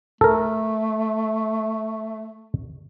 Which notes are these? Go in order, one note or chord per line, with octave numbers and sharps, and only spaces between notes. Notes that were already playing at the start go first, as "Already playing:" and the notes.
A3 A4 A#4